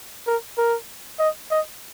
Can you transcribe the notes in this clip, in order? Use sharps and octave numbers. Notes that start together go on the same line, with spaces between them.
A#4
A#4
D#5
D#5